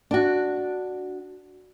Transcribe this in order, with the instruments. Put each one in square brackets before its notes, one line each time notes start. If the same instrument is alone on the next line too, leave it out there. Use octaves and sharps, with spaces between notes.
[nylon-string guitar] D4 F#4